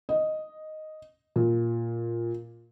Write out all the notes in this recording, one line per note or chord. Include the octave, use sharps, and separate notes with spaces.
D#5
A#2